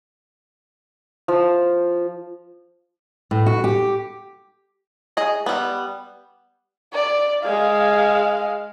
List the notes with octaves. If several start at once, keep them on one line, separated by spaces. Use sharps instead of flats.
F3
A2
F#4
G4
G#4 D#5
G3 B3
D5
G#3 F5